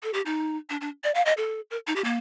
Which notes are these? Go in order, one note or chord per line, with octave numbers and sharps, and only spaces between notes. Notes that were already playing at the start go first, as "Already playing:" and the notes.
A4
G4
D#4
D4
D4
D5
F5
D#5
A4
A#4
D#4
G4
A#3